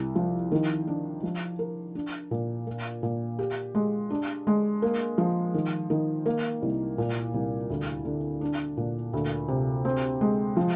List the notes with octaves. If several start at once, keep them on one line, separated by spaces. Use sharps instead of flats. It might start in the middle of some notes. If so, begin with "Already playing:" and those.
Already playing: C2
F3
D#3
D4
F3
A#4
D4
A#2
A#3
A#2
G4
G#3
D4
G#3
A#3
F3
D#3
D#3
A#3
C2
A#2
C2
D2
D3
D4
A#2
D2
C3
C4
G#3
F3